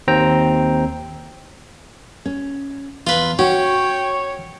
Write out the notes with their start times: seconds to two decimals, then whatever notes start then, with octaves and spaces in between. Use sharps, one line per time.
0.08 D#2 C4 G5 A#5
2.26 C#4
3.07 E2 F4 B4
3.39 C#4 F#4 C#5 G5